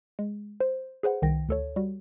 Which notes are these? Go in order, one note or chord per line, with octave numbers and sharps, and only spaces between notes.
G#3
C5
G#4 B4 C5 F#5
C2 D#3 G5 A#6
D2 A4 C#5
G3 F#4